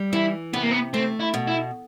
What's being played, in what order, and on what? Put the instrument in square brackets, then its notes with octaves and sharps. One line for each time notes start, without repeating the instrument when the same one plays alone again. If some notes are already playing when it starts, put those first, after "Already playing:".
Already playing: [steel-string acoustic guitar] G3
[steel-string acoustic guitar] E3 [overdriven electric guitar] E4
[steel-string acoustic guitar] C3 [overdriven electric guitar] B3
[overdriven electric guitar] A#3
B3
[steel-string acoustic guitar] A3 [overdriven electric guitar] C4
[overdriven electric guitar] E4
[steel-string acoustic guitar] B2
[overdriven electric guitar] E4